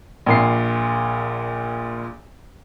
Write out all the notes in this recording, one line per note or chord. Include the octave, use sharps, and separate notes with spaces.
A#1 A#2 C7